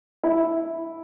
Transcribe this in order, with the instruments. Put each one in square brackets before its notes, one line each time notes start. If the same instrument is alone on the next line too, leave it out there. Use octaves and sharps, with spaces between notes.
[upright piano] E4